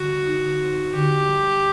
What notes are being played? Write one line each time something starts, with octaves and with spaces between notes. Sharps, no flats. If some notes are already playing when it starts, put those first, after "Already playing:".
Already playing: D3 G3 F#4
D#4
C4
D3 G4
G3